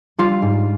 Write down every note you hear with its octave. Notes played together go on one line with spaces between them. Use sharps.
G3 F4
G#2